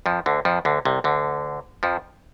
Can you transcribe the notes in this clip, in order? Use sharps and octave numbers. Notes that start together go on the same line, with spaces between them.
F2 F3
D2 D3
F2 F3
D2 D3
C2 C3
D2 D3
F2 F3